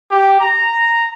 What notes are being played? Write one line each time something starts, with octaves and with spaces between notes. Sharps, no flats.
G4
A#5